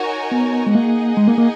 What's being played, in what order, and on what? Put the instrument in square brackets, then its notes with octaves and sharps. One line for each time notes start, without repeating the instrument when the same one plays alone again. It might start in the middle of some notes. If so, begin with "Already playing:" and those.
Already playing: [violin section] D#4 F#4 A#4 C#5 G#5
[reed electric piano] B3
G#3
[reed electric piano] A#3 [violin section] D#4 G#4 D#5 F#5
[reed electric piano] G#3
A#3
A#3